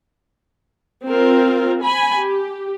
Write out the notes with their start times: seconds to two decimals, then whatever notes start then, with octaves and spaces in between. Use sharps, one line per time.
1.07 C4 F4 A#4
1.82 G#5 B5
2.16 G4